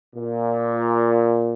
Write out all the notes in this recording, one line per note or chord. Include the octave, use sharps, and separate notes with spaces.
A#2